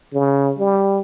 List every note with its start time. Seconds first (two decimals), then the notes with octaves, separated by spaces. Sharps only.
0.13 C#3
0.59 G3